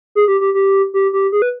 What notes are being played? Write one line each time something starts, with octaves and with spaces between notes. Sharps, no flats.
G#4
G4
G4
G4
G4
G4
G#4
B4